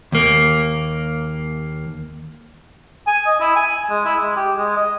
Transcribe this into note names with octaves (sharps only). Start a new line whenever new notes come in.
D#2 A#3
G#5
D#5
E4
G#5
G#3
E4
G#3
G4
G#3
D#5